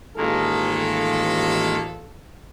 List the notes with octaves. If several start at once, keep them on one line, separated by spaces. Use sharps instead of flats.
A1 D#3 G#3 A#3 F4 A4